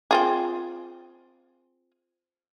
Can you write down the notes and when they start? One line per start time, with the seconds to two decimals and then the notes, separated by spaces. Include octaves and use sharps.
0.11 C4 F4 G#4